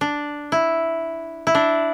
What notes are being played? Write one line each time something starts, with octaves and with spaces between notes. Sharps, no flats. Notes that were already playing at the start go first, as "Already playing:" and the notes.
D4
E4
E4
D4